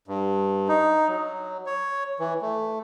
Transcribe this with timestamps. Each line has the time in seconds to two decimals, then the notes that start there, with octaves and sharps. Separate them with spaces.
0.08 G2
0.69 D#4
1.08 F#3
1.66 C#5
2.19 E3
2.42 A3